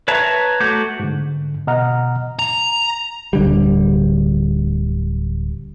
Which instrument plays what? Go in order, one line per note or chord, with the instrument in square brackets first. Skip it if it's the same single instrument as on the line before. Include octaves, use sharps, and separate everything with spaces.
[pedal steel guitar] B4 C#5 E5 A5 A#5
A3 F#4 D6 G6
[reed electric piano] G#2 D3
B2 D#5 F#5 A#5 F6
[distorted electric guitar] A#5
[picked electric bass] D1 D3 G3